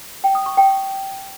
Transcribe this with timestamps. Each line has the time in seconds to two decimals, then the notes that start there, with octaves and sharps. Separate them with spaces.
0.24 G5
0.35 D#6
0.46 C#6
0.57 G5